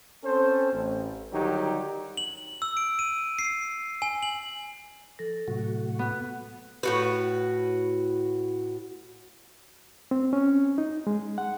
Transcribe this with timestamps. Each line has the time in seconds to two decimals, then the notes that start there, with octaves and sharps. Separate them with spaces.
0.24 C4 C#4 A4 C5
0.73 A1
1.32 D3 D#3 F#3 G3 D#4 G4
2.17 F#7
2.62 E6
2.77 D7
2.99 D#7
3.39 C7
4.02 G#5
4.23 F#7
5.19 F3 A4 A#6
5.48 A2 C3 F#3 A3 F#4
5.99 B3
6.83 A2 F#4 B4
10.11 C4
10.33 C#4
10.78 D#4
11.07 G#3
11.38 F#5